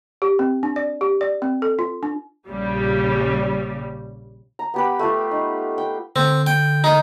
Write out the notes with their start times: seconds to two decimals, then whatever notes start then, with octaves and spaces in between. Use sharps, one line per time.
0.22 G4
0.39 C4
0.63 D4
0.76 D5
1.01 G4
1.21 D5
1.42 C4
1.62 A4
1.79 F4
2.03 D4
2.48 A#1 C#3 G3
4.59 A#5
4.74 B3 G4 B4
4.99 A3 F4
5.31 D#4
5.78 G5
6.16 D3 C4
6.46 G5
6.84 D#4